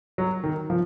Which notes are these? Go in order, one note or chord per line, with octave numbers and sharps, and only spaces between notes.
F#3
D#3
F3